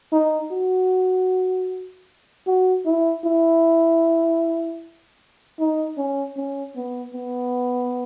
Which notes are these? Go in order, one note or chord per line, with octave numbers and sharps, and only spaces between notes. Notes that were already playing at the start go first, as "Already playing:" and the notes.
D#4
F#4
F#4
E4
E4
D#4
C#4
C#4
B3
B3